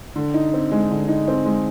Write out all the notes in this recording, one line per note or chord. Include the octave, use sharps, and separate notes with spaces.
D3
D#4
C4
G#3
D3
D#4
C4
G#3